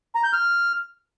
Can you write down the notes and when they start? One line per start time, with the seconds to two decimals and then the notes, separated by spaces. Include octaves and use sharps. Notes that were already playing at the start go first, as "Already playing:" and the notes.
0.15 A#5
0.24 G6
0.33 F6